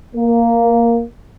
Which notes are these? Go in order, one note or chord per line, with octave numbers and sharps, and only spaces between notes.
A#3